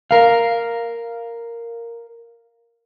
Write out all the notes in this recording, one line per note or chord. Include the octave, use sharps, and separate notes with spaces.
A#4 F5